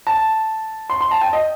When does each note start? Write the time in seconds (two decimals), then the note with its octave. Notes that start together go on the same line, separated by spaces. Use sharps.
0.07 A5
0.90 C6
1.01 C6
1.11 A5
1.21 G5
1.33 D#5